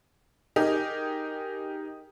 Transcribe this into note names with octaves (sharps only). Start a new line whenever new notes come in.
D#4 G4 G#4 A#4